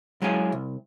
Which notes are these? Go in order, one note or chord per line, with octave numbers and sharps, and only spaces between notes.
F#3 G#3 C#4 E4 G#4 F5
C2